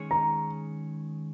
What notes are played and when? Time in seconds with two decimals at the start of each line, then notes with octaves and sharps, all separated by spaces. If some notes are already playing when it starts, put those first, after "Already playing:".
Already playing: D#3 G#3 C#4 G#4 C#5
0.11 A#5